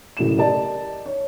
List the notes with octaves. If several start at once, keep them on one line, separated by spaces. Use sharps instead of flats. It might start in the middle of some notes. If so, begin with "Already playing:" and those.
F#1 A2 E7
G4 A#4 D5 D#5 A5
C#5